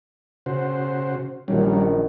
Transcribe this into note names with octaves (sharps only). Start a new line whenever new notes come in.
C#3 F#4 C5
A#1 A#2 D#3 F#3 G3 C#4